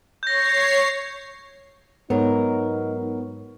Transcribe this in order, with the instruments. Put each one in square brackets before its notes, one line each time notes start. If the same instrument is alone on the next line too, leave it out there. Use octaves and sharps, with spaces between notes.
[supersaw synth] C#5 C7 [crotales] G6 A#6
[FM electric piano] G#2 [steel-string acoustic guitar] F#3 A#4 [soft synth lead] B3 [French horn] D#4